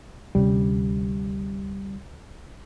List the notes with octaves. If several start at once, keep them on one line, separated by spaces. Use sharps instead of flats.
D2 C3 G3 C#4